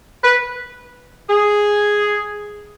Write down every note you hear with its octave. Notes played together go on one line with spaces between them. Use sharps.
B4
G#4